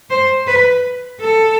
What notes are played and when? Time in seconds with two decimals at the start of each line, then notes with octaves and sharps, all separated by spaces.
0.10 C5
0.47 B4
1.21 A4